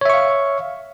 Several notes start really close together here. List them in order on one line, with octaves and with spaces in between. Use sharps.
C#5 E5 C#6 F5